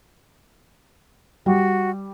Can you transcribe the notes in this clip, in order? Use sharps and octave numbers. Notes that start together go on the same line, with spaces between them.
G3 F#4